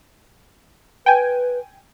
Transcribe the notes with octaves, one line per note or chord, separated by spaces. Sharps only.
B4 G5 G#5